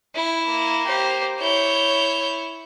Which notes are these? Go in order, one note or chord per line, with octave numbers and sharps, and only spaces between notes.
E4
A#3
G4 C5
E4 C#5 G6